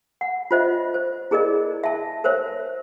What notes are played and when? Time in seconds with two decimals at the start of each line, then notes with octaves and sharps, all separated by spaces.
0.21 F#5
0.51 F4 C5 D#5 E5
0.94 C5
1.31 E4 G#4 A#4 D5 D#5
1.84 E5 A5
2.24 A#4 C5 C#5 E5